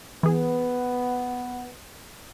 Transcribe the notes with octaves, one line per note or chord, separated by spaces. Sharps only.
E3 B3 G#4